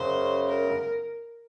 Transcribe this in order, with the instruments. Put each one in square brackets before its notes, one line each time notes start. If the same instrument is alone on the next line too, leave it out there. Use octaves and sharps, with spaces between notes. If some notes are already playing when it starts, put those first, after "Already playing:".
Already playing: [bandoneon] F#2 C#3 F#3 [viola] C5
[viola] A#4